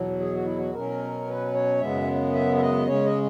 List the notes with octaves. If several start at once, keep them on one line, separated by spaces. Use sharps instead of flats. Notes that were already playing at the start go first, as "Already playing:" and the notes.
Already playing: E2 B2 F#3
G#4
F#4
E4
F#4
B2 F#3 C#4 A#4
B4
C#5
F#2 C#3 G#3 B3 E5
E5
E5
D#5
C#3 G#3 C#4 C#5
D#5